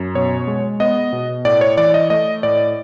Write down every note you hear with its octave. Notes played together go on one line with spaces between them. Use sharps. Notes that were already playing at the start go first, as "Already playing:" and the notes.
Already playing: F#2
B2 C#5
G#3
B3 D#5
B2
A2 D5
C#5
E3 D5
D#5
A3 D#5
A2 D5